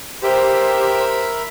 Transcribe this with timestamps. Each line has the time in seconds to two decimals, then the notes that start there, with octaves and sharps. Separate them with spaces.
0.23 G4 A#4 C5 E5 B5